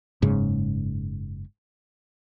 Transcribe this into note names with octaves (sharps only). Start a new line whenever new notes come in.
F#1 G#2 C#3